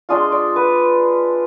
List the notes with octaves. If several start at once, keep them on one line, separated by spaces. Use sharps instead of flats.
G#3 D4 F4 D#5
D5
B4